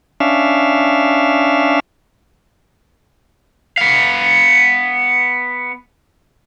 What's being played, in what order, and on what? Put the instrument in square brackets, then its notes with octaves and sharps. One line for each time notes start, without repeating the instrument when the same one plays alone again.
[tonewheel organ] C#4 D4 E5 F5
[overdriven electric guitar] B3 F5